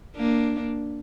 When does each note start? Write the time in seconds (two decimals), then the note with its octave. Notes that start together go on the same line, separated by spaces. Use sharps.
0.16 A#3 D4